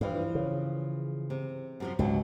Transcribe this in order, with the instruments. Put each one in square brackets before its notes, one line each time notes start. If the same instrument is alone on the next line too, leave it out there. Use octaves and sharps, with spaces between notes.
[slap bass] G2 [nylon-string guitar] E3 F3
[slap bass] C#3
[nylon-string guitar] C3
F#2 C3 F3
[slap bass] C#2 [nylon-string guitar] G#2 B2 F#3